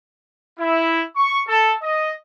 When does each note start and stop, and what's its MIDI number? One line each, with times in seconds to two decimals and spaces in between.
0.59 1.03 64
1.15 1.41 85
1.47 1.71 69
1.82 2.12 75